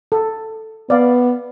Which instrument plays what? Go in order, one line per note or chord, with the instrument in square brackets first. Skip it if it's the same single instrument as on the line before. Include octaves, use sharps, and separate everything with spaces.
[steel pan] A4
[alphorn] B3 [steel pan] D5 F5